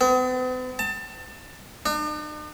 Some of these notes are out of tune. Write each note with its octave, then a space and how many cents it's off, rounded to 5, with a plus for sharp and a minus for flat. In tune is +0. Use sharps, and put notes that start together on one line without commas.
B3 +45
A5 +25
D4 +45